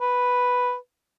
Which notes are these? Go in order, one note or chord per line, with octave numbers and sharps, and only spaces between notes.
B4